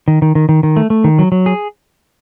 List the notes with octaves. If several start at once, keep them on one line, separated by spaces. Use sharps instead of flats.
D#3
D#3
D#3
D#3
D#3
A3
A3
D#3
F#3
F#3
G#4